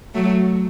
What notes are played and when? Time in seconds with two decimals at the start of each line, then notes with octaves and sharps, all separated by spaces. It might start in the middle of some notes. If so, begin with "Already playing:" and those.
0.14 F#3 A3